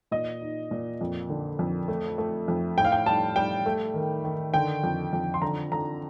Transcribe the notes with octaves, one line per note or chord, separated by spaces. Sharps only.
A#2 D#5
D#4
A#2
F2
D3
F2
A3
A3
F2
A2 G5
F5
G5
G3 A5
G3 G5
A3
D#3
D#3
D3 G5
F2
F2
C6
D3 A#5
D3 A#5